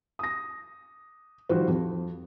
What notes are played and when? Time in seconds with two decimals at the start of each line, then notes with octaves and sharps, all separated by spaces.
0.19 D#6 A#6
1.49 D#3 F3 G3 F4 F#4 C5
1.67 F2